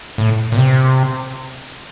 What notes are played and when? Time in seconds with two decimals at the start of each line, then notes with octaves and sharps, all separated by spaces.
0.18 A2
0.52 A#2
0.57 C3